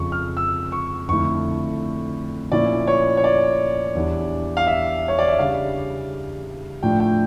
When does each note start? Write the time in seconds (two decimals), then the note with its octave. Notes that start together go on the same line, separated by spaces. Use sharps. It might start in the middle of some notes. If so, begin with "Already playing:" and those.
Already playing: F2 C#3 F3 C#6
0.12 F6
0.37 E6
0.72 C#6
1.08 F2 D3 A3 E4 C#6
2.52 A#2 F3 C#4 E4 D5
2.87 C#5
3.17 C#5
3.24 D5
3.95 E2 E3 G3 D4
4.57 F5
4.67 E5
5.08 C#5
5.19 D5
5.28 E5
5.39 C#3 G3 D4 F5
6.82 A2 F3 A3 D4 F4 G5
7.00 G5